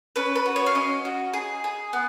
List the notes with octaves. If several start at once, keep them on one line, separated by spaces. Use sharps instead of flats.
C#4 B4
B4
F#4
C#5
F5
C#4 D#5
F#4
G#4
G#4
B3